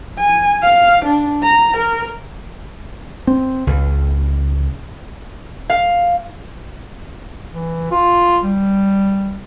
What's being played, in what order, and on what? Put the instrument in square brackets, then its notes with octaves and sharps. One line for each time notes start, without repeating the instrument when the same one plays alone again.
[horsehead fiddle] G#5
F5
D4
A#5
A#4
[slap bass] C4
C#2
[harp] F5
[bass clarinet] E3
F4
G3